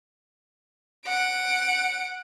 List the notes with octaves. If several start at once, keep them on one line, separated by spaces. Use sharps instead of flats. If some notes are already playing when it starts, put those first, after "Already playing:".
F#5 D7